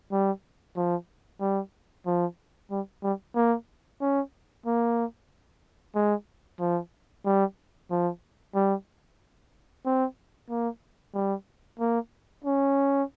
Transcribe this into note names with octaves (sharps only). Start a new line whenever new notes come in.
G3
F3
G3
F3
G3
G3
A#3
C#4
A#3
G#3
F3
G3
F3
G3
C4
A#3
G3
A#3
C#4